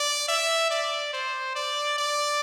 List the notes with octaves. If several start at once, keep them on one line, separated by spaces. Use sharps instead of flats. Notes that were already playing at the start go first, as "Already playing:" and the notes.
Already playing: D5
E5
D5
C5
D5
D5